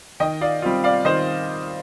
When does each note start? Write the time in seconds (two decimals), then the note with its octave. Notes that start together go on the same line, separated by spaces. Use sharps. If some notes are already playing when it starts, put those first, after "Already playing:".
0.20 D#3 D#5 G5
0.41 D5 F5
0.62 G3 C4 F4
0.84 D5 F5
1.05 D#3 C5 D#5